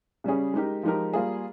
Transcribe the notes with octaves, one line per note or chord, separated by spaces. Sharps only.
C#3 G3 C#4 G#4
G#3 D#4 G4 A#4
F3 G#3 D#4 G4 A#4
G3 A#3 F4 G#4